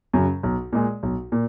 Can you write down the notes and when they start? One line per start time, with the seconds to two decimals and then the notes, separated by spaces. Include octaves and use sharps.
0.13 F#2 C#3 F#3
0.43 B1
0.73 A#2 G#3
1.03 B1
1.32 A#2